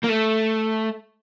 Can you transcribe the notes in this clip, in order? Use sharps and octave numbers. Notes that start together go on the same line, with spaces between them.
A#3
A3